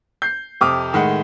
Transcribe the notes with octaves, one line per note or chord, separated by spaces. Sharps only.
G6 C7
F2 C3 D6 D#6 F6
A2 D#3 G#3 F#5